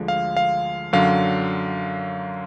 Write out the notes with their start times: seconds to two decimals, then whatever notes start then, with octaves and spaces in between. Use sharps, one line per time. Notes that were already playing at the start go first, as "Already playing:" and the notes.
Already playing: D2 D3 F3 G#3
0.08 F5
0.37 F5
0.93 F#2 D3 F#3 F5